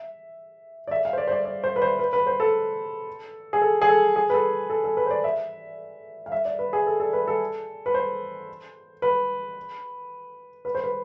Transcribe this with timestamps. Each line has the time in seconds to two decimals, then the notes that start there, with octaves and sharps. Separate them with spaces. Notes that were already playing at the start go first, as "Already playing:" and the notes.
Already playing: E5
0.87 D5
0.91 E5
1.05 F5
1.13 C5
1.18 D5
1.27 C5
1.32 D5
1.45 D5
1.64 C5
1.76 B4
1.82 C5
1.99 B4
2.13 B4
2.27 C5
2.40 A4
3.53 G#4
3.61 A4
3.82 G#4
3.89 A4
4.16 G#4
4.30 B4
4.34 A4
4.70 A4
4.84 A4
4.97 B4
5.06 C5
5.11 D5
5.24 E5
6.26 F5
6.32 E5
6.45 D5
6.59 B4
6.73 G#4
6.87 A4
7.00 A4
7.13 B4
7.27 A4
7.86 B4
7.94 C5
9.02 B4
10.65 B4
10.75 C5
10.84 B4